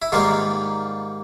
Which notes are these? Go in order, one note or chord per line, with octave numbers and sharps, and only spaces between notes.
E4
G#2 D#3 G3 A#3 F4